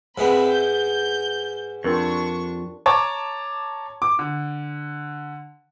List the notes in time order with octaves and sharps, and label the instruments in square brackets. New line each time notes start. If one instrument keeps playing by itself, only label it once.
[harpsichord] G#2 G#3 B3 [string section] C4 E5 B5
[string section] G6
[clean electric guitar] F2 [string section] D4 C#6 [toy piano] G4 A#4 C6
[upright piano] C#5 A5 A#5 D6
D6
D3